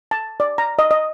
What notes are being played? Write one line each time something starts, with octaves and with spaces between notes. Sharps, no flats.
A5
D5
A#5
D#5
D#5